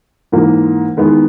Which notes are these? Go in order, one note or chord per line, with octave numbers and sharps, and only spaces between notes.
G#2 E3 A#3
D#3 G#3 B3 E4